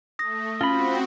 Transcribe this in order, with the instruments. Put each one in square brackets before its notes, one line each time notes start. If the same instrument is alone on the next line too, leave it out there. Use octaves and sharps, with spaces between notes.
[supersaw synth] A3 [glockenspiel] D#6 A#6
[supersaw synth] C4 F#4 [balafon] C#4 [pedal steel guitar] F4 B5